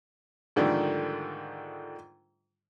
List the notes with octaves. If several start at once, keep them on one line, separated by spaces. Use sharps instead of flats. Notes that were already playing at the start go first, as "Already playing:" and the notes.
G#2 D3 D#3 F3 G3 A3